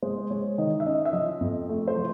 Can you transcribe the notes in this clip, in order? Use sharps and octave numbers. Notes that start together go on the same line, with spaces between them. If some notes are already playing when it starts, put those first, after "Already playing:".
G#3 C5
G#3 C#5
D#3 D#5
E5
C#4 D#5
E5
F3 D#5
F2
A3
C5
F3